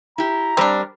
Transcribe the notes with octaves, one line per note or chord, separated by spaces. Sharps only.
E4 G4 A#5
G3 C4 D4 A#4